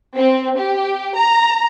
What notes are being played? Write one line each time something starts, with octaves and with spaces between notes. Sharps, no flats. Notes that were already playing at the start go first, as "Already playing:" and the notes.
C4
G4
A#5